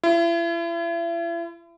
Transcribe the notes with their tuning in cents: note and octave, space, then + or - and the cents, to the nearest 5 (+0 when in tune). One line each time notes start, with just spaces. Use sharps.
E4 +40